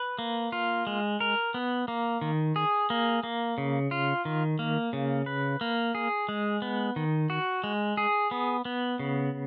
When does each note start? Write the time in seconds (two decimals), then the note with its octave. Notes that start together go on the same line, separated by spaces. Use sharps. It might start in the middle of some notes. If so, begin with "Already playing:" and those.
Already playing: B4
0.19 A#3
0.52 F4
0.87 G#3
1.20 A#4
1.54 B3
1.88 A#3
2.21 D#3
2.56 G#4
2.90 A#3
3.23 A#3
3.58 C#3
3.91 F4
4.25 D#3
4.59 A#3
4.93 C#3
5.26 B4
5.61 A#3
5.95 G#4
6.29 G#3
6.62 B3
6.96 D#3
7.30 F#4
7.64 G#3
7.97 G#4
8.31 B3
8.65 B3
8.99 C#3